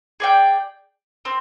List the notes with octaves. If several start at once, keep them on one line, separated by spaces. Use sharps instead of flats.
G#4 D5 G5
C4